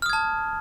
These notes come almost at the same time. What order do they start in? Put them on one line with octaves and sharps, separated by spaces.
F6 D#6 G#6 A5